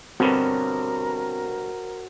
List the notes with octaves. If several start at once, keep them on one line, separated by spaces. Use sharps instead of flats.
G2 B2 D3 C4 F#4 A#4 C5 C#5